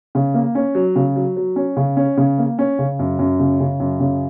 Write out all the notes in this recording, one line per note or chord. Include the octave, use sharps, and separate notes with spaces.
C#3
A#3
C#4
F#3
C#3
F#3
F#3
C#4
C#3
C#4
C#3
A#3
C#4
C#3
F#2
F#2
C#3
C#3
F#2
C#3